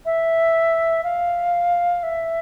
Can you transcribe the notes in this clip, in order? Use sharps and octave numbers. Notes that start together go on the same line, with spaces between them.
E5
F5
E5